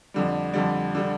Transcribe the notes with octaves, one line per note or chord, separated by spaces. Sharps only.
F2 D3 G3
F2 D3 G3
D3 G3